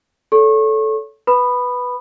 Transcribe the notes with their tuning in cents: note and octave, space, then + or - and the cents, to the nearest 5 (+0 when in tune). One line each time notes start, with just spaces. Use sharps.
A4 -10 C#5 +25 C#6 -30
B4 +0 B5 +0 D#6 -30